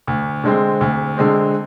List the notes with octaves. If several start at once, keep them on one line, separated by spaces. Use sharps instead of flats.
D2
D3 G#3 C4
D2
D3 G#3 C4